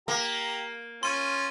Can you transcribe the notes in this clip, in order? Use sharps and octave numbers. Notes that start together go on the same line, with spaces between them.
A#3 G4 A#5
C#4 F4 C6 D#7